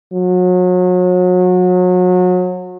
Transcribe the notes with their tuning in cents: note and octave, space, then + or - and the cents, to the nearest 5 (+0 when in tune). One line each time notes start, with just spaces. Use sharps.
F#3 -35